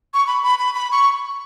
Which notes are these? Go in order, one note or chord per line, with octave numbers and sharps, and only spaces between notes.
C#6
B5
B5
B5
B5
C#6